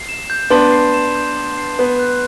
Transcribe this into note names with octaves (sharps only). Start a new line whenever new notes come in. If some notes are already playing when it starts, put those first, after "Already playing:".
Already playing: C7
E7
G6
B3 D4 C6
C7
E7
G6
C6
C7
B3 C6
F#6